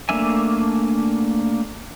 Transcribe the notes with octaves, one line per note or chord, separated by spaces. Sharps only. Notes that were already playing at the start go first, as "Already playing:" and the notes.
A3 A#3 D4 E5 G#5